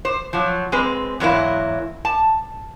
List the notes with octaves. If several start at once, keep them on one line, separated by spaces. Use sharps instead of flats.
C5
F3 F#3
G#3 C4 B4
E2 G#2 F#3 A#3 E4
A5